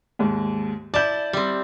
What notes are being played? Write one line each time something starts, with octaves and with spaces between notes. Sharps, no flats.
D#2 G#2
E4 D5 A5 G6
G3 C4